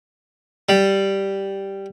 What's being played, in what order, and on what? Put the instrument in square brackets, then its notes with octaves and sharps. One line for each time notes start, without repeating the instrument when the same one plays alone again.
[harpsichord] G3